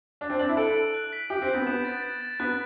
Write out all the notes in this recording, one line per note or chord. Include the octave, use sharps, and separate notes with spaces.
D4 F#6
C4
D4 F#7
E4
A4 D7
D7
F#6
B6
G4 D7
C4
G6
B3
B3 E7
A6
A6
A6
B3 F#6